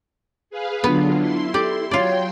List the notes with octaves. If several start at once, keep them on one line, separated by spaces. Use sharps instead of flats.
G#4 B4 F5
D3 F#3 B3 D4 F4
E4 C6
G4 A4 D5
F#3 F4 C#5 D5 G5 C6